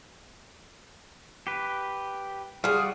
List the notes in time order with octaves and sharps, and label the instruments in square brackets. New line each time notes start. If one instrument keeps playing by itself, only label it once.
[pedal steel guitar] G4 B4
[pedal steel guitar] G3 F4 F#4 [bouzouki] G#4 F5